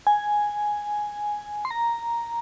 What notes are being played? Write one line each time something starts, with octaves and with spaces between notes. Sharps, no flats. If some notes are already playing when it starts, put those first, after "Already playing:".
G#5
C6
A#5